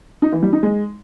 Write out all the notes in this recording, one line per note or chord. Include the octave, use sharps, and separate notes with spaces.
D#4
E3
G3
D#4
G#3